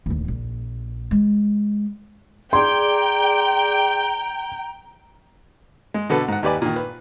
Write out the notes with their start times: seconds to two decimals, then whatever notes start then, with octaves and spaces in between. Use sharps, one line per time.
0.06 D1 D#2
0.28 A#1
1.11 G#3
2.53 G#4 D5 G5 A#5 C6 D6
5.94 G#3
6.10 B2 D3 A4 B4
6.28 G#2 F#5
6.43 D#2 G4 B4 D5 G#5
6.62 A#2 D#3
6.76 B4